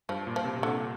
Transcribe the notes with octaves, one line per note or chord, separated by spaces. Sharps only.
G2 F3
A#2
F3
C3
C3
A#2 D3